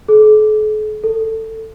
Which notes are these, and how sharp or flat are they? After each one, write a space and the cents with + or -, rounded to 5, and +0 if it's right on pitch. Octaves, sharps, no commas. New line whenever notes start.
A4 -45
A4 +15